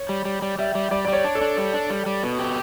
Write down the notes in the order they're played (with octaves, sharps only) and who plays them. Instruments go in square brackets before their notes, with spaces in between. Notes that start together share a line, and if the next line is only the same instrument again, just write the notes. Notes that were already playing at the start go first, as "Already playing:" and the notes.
Already playing: [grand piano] C#5
[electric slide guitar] G3
G3
G3
[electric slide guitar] G3 [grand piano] E5
[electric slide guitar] G3
[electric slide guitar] G3 [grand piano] D5
[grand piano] D5
[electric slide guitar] G3 [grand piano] C#5
[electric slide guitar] D4
[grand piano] A4
[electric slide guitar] D4
G3
D4
G3
G3
B2
G4